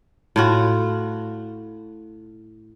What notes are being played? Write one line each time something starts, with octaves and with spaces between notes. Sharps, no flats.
A2 F4 F#4